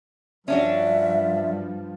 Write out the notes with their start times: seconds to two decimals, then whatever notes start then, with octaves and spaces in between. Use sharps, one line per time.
0.48 G2 F3 C#4 D4 F#4 E5